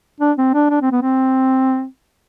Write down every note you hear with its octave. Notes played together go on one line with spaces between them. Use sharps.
D4
C4
D4
D4
C4
B3
C4